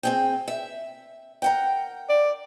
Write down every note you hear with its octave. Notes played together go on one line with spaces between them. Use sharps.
C4 G#4 G5
E5
A#4 F#5 G5
D5